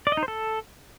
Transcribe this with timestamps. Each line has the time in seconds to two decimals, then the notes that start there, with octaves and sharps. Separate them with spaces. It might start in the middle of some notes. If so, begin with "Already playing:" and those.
0.07 D5
0.12 D#5
0.17 D#4
0.23 C5
0.28 A4